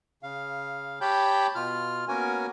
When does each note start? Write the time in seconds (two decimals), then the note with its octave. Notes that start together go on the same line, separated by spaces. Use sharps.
0.23 C#3 F5
1.01 G4 C#5 G5 A5 B5 G6
1.55 B2 F4 F6
2.08 A#3 B3 C#4 F#4 A#4 G#5